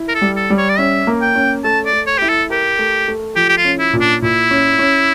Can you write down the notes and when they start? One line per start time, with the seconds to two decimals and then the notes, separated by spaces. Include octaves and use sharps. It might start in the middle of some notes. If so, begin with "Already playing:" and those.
Already playing: E4
0.08 A#4
0.15 A4
0.22 G3
0.36 A4
0.50 G3
0.57 C#5
0.69 D5
0.79 C#4 E5
1.07 A#3
1.22 G5
1.35 C#4
1.64 A3 A5
1.86 D5
1.93 A3
2.07 C#5
2.18 E4 G4
2.29 A4
2.50 G4 A#4
2.79 A3
3.08 A3
3.36 F3 G4
3.49 G4
3.57 F4
3.65 C#4
3.78 E4
3.93 A#2
4.00 D4
4.22 A#2 E4
4.51 C#4
4.79 C#4